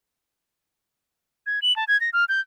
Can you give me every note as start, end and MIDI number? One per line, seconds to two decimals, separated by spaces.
1.46 1.60 92
1.62 1.75 102
1.76 1.84 81
1.88 1.99 92
2.01 2.10 94
2.13 2.25 89
2.29 2.40 91